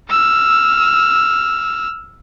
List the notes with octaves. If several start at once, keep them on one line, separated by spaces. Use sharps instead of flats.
E6 F6